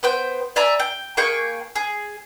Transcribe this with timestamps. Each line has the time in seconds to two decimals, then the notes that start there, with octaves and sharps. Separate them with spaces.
0.03 B3 C5 G5
0.56 D5 E5 G#5 A#5
0.80 G5
1.17 A#3 G#4 G5 C#6
1.76 G#4